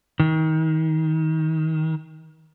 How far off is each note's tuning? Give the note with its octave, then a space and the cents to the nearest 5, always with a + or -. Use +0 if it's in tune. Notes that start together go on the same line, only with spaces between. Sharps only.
D#3 +30